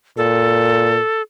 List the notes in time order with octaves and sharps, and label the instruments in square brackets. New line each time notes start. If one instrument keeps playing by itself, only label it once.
[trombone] A#2 [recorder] A4